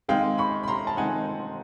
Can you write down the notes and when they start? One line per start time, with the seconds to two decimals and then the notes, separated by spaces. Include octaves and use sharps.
0.08 D#3 G#3 C4 D#4 F5 G5
0.38 B5 C#6
0.64 B5
0.68 A#5 C6
0.87 A5
0.97 D#3 G#3 C4 D#4 F#5 G#5